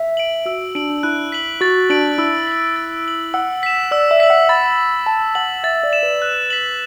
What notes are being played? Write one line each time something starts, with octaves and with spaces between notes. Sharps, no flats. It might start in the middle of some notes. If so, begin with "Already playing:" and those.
Already playing: E5
D7 F#7
F#4 E6
D4 D7 F#7
D4
E4 F#6
B6 F#7
F#4 A6
D4 D7 F#7
E4 E6
B6 F#7
A6
D7 F#7
F#5 E6
B6 E7
D5 E6
E5
B6 F#7
F#5
B5 A6
F#7
A5 A6
F#5 F#7
E5 A6
D5
E7
B4
F#6
B6 F#7